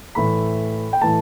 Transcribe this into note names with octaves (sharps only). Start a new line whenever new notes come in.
A2 E3 A3 B5
G5
A2 E3 A3 A5